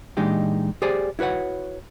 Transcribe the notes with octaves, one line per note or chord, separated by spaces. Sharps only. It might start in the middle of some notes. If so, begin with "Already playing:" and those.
A#2 E3 G#3 D4 D#4 G4
G4 G#4 C5 D5 G#5
E4 F#4 B4 C#5 F#5